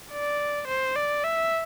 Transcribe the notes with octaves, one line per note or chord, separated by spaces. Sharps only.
D5
C5
D5
E5